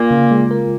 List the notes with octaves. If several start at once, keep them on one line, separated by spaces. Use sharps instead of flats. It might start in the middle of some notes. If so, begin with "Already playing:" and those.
Already playing: A#2 A#3 F4
C#3
G#3
A#4